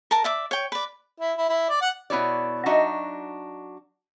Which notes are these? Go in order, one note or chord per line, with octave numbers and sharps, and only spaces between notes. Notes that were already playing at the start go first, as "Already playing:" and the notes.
A#4 A5 A#5
D5 E5 D6
C#5 G5
B4 D5
E4
E4
E4
D5
F#5
B2 B3 E4 C#5 D5
F#3 D4 D#4 F#4 D#5 E5